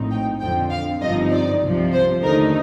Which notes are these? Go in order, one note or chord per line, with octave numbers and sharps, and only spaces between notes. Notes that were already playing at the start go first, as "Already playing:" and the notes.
Already playing: A#1 A2 F3 C4 D#4
G5
F2 D3 F3 C4 G5
F5
G1 G2 F3 C4 D#4 D#5
D5
C2 C3 F3
C5
D#2 D3 A3 D#4 A#4